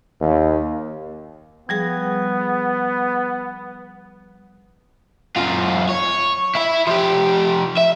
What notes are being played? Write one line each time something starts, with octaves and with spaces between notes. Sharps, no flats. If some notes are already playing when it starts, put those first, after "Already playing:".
D#2
F3 G3 B3 G#4
F#2 F4
C#5
E4 E5
F3 G4
E5